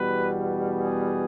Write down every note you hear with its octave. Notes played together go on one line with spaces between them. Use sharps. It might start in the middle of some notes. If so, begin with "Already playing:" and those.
Already playing: E2 B2 G3 B3 B4
G#4